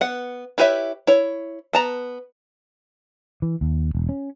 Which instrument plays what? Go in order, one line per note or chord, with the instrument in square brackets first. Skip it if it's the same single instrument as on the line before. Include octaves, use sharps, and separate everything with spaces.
[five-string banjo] B3 F#5
E4 G4 B4 C#5 E5
E4 C#5
B3 A5 A#5
[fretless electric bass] E3
D#2
E1
C#4